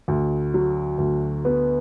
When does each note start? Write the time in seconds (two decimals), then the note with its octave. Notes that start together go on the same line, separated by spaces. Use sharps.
0.08 D2
0.54 F#3
0.98 D2
1.45 B3